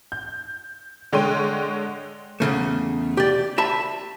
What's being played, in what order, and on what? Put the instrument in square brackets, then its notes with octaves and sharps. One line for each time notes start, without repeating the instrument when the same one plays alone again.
[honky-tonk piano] G6
D3 G#3 C#5 G5 C6 D#7
[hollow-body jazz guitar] E2 G#2 C#3 A3
G4 D5
E5 A5 B5